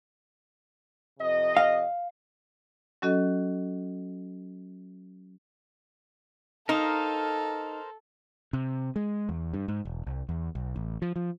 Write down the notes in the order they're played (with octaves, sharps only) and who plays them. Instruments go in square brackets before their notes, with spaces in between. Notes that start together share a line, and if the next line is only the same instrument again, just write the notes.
[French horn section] F2 C3 D#5
[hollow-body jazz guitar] F5
[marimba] F#3 C#4 F#4 A4 D#5
[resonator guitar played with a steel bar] D#4 [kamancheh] A4 [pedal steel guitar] A#4 C5 F5
[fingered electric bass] C3
G#3
E2
G2
G#2
E1
C2
E2
B1
A1
F3
F3